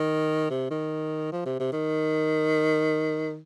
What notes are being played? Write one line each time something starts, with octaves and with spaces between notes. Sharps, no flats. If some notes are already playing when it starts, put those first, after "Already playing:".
Already playing: D#3
C3
D#3
F3
C3
C3
D#3